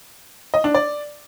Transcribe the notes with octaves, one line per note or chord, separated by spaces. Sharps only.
D#5
D4
D5